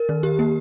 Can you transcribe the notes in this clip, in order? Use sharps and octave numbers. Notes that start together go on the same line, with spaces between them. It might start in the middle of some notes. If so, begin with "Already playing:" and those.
Already playing: A#4
D#3
G4
A#3